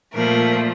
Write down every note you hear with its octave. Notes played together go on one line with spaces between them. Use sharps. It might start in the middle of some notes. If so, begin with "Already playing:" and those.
A#2 F3 A3 A#4